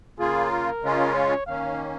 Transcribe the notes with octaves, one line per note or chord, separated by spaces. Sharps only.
C#3 A#3 F4 G#4
A#4
C#3 G#3 C#4 F4
C#5
D#3 A#3 C#4 F5